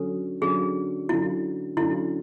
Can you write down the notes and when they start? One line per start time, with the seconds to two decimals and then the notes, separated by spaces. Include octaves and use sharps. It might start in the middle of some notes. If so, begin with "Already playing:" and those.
Already playing: D3 F#3 C#4 A4
0.41 D3 F#3 C#4 G#4
1.09 D3 F#3 C#4 E4
1.77 D3 F#3 C#4 E4